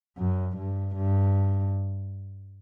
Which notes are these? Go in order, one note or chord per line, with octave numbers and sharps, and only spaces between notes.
F#2
G2
G2